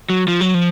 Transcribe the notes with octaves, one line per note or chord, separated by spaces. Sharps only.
F#3
F3
F#3
F3